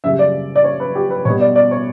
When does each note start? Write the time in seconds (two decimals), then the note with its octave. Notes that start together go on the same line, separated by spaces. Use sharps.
0.04 F#2 C#3 G3 E5
0.19 D5
0.56 D5
0.64 C#5
0.80 B4
0.95 G4
1.10 B4
1.25 B2 G3 B3 C#5
1.41 D5
1.56 D5
1.71 C#5